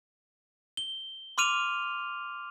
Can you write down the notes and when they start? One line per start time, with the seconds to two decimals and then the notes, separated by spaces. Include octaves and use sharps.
0.77 G7
1.38 C6 D6 F6 D#7 F7